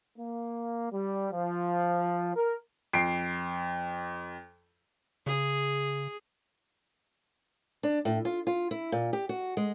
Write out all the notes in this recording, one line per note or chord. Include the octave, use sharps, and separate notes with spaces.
A#3
G3
F3
A#4
F2 C7 D7
C#3 G#4
D4
A2
F4
F4
E4
A#2
G4
F#4
G#3